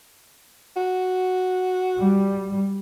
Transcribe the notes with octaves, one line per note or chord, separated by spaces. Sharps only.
F#4
G3